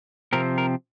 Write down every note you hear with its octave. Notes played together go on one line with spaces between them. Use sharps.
C3 F3 C4 A#4
A#4